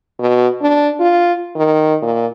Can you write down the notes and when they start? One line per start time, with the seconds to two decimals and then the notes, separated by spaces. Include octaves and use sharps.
0.19 B2
0.61 D4
1.00 F4
1.56 D#3
2.02 A#2